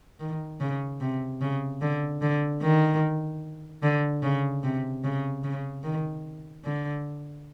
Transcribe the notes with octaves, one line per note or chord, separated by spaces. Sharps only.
D#3
C#3
C3
C#3
D3
D3
D#3
D3
C#3
C3
C#3
C#3
D#3
D3